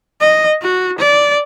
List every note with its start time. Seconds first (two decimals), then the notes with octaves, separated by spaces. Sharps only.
0.20 D#5
0.62 F#4
0.99 D5